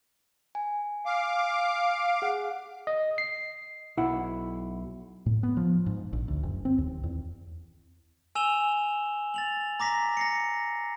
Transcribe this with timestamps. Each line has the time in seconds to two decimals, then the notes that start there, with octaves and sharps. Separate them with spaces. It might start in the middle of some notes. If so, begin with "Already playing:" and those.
0.55 G#5
1.06 F5 D6
2.22 G#4 F#5
2.87 D#5
3.18 C7
3.97 B1 E4 F#5
5.26 A2
5.43 B3
5.57 F3
5.86 G#2
6.13 A#1
6.28 D2
6.43 F#1
6.65 C4
6.78 D#2
7.03 E2
8.35 G#5 E6 E7 F7 G7
9.34 A6 F7 F#7
9.80 A#5 D6 A#6 B6
10.17 A#6 C7 C#7